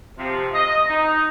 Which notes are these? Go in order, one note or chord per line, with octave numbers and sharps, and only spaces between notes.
C3 F3
D#5
D#4